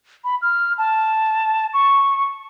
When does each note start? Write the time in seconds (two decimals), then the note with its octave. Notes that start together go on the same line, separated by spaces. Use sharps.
0.24 B5
0.42 F6
0.78 A5
1.74 C#6